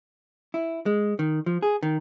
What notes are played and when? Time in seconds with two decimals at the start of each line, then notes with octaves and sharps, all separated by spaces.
0.54 E4
0.86 G#3
1.19 D#3
1.46 F3
1.63 G#4
1.83 D#3